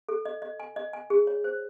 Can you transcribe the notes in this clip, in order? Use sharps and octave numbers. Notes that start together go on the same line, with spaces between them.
A4
D#5
D#5
G#5
D#5
G#5
G#4
C#5
C5